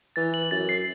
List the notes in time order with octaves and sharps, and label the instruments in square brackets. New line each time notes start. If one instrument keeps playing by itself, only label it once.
[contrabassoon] E3 [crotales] A6
[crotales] F#7
[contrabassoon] F#2 [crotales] A6
[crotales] C7